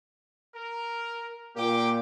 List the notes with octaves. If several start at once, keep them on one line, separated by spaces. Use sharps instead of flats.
A#4
A#2 A#3 G4 G5 D6